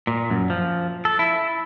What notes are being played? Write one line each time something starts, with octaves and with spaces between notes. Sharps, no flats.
A#2
F#2
F3
A4
E4